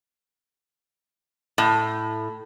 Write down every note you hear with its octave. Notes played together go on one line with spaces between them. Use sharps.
A2